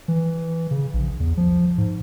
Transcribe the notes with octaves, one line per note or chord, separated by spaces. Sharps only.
E3
C#3
A#1
E2
F3
G#2